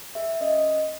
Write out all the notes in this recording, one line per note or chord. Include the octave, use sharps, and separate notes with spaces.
G#4 E5
C#4 D#5